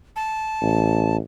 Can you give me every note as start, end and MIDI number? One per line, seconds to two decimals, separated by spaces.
0.16 1.16 81
0.61 1.18 33